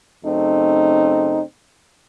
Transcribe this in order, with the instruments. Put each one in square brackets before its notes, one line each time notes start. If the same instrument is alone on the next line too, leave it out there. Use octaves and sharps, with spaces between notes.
[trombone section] F#2 C#3 A3 C4 D#4